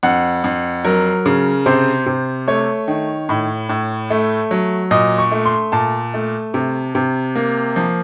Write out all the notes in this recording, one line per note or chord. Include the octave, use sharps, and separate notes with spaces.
F2 F#5
F2
F#3 A#4
C#3
C3 C5
C3
A3 C#5
D#3
A2
A2
A3
F#3
A#2 D#5
C#6
A3
C6
A#2 A5
A3
C3
C3
A#3
F3